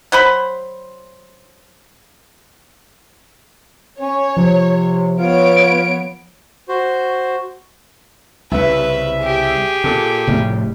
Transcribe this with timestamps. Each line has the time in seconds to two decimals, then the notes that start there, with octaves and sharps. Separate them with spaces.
0.12 F#3 C5 B5
4.00 C#4 C#5
4.37 C3 F3
5.19 B3 F4 C#5 D7
6.69 F#4 C5
8.51 C2 C#3 B4 E5
9.20 G4 G#4
9.84 A#2 A4
10.27 F1 A2 G3